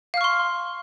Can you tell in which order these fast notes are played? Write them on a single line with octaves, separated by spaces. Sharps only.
F5 F6 C#6 C6